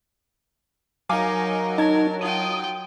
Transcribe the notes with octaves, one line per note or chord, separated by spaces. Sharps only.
F#3 D#4 A#4 F5 G#5 D6
D#4 A#4 A5 G#6
F4 G5 D#6